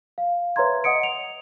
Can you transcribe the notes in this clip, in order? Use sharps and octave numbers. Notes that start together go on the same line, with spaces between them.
F5
B4 C#5 E5 A#5 C6 G#6
D#5 F#5 D#6 C#7 D7
F7